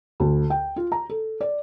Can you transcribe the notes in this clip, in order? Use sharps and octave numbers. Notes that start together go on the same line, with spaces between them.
D2
G5
F4
A#5
A4
D5